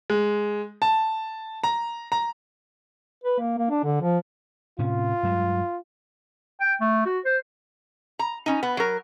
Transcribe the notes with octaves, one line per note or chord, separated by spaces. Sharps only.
G#3
A5
A#5
A#5
B4
A#3
A#3
D4
D3
F3
A2 C3 C#4 F4
G2 F#3 G#3
G5
A3
F#4
C5
A#5
C#4 D#4
B3
F#3 A#4